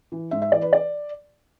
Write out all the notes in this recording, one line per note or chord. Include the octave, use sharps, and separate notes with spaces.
E3
G#2 E5
E5
E3 D5
B4
D5